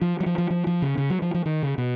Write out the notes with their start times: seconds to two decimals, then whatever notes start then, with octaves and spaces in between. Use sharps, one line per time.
0.02 F3
0.20 F#3
0.26 F3
0.38 F3
0.50 F3
0.67 F3
0.82 C#3
0.98 C#3
1.10 F#3
1.22 F3
1.34 F3
1.46 D#3
1.63 C#3
1.78 B2